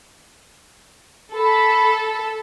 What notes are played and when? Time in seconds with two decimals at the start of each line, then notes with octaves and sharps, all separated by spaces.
1.34 A4 B5